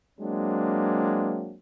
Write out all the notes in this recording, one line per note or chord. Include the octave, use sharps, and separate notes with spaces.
F#3 G#3 A#3 C4 D4